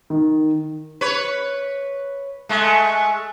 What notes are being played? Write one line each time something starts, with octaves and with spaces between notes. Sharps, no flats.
D#3
B4 C#5
G#3 A3